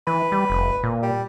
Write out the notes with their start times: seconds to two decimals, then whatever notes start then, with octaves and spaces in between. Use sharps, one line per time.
0.07 E3 B4
0.32 G3
0.50 F1
0.83 A#2
1.02 G3